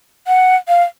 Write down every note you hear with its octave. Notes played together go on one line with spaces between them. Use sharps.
F#5
F5